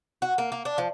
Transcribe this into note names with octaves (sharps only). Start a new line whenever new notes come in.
F#4
A#3
A#3
D4
F3